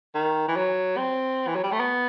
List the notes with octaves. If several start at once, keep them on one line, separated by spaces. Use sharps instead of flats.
D#3
E3
F#3
C4
E3
F#3
G3
A3
B3